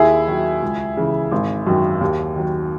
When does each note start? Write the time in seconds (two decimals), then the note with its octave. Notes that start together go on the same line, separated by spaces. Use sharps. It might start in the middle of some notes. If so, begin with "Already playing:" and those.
Already playing: D#2 E4 G#4
0.27 D#3 F#3
0.63 C#2
0.97 C#3 E3
1.32 G#1
1.67 F#2 D#3 F#3
2.01 D#2
2.36 D#3 F#3